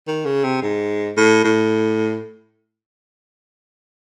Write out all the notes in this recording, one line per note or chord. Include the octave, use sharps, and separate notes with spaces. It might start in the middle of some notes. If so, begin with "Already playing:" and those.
D#3
C#3
C3
G#2
A2
A2